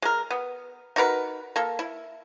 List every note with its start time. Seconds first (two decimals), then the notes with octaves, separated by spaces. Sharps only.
0.02 G#3 A#4
0.31 B3
0.96 D#4 F#4 A#4 B4
1.56 A#3 A4
1.79 E4